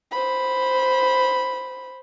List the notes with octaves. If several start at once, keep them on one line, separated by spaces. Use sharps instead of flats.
C5 B5